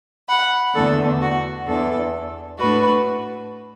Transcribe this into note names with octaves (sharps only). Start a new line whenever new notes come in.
F#5 B5
E2 D3 A3 D4 A4
F#4
E2 E3 D4 A4
A2 A3 D4 F#4 B4